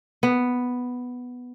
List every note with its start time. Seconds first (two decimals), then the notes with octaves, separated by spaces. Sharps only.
0.23 B3